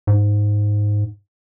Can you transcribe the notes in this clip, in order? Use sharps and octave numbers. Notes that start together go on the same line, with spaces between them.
G#2